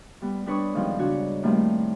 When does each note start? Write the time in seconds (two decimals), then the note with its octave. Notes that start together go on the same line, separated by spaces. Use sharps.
0.22 G3 B3
0.46 G3 D4 B4 C#5 C#6 D#6
0.74 G#2 D#3 F3 G3 B3 C4
0.98 C#3 D4 F#4 C#5
1.43 A2 D#3 G3 A3 A#3 C4